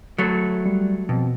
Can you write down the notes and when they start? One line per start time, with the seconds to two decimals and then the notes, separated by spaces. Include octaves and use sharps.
0.18 F#3 A3
0.65 G3
1.09 F2 B2